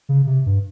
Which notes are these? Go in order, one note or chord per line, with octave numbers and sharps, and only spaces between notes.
C#3
C3
G2